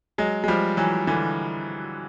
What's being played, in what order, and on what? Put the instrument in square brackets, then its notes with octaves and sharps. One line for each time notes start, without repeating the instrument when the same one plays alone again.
[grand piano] F#3 G#3
G#3
F3 G3
E3 F#3
D3 E3